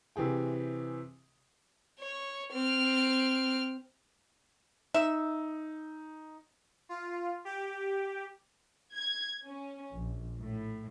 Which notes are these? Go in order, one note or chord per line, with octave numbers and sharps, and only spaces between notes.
C3 E3 G4 G#4 G5
C#5
C4 F6
D#4 E5
F4
G4
G#6
C#4
A#1
A2